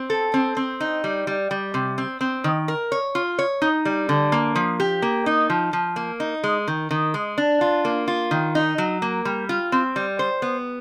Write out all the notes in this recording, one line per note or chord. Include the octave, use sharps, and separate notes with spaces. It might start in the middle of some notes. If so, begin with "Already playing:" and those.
Already playing: C4
A4
C4
C4
D#4
G3
G3
G3
C3
C4
C4
D#3
A#4
C#5
F4
C#5
D#4
G3
D3
A#3
F3
G4
A#3
D#4
F3
F3
A#3
D#4
G#3
D#3
D#3
G#3
D4
F4
A#3
F4
D#3
D#4
F#3
A#3
G3
F4
C4
G3
C5
B3